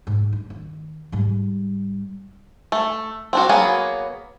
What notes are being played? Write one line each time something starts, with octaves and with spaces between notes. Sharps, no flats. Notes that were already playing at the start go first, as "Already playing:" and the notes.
G#2
D4
D#3
G#2 G3
A3
C4 D4 F#4
F#3 A#3 B3 G#4